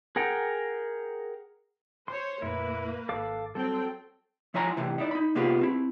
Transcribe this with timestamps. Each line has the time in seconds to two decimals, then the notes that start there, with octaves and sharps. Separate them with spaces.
0.16 G#4 A#4 F#5 G5 A#5
2.08 C5 C#5 C6
2.42 F2 A#2 A3 A#3 E4 B4
3.09 G#1 A4 F5 D6
3.55 F#3 G3 C4 A4 G5
4.54 F3 E4 C#5 G#5 A#5 C6
4.77 C2 A2 C3 E3
4.98 D#4 E4 D5
5.11 D#4 B5
5.35 C3 A#3 B3 F4 G4 G#4
5.61 C4 E4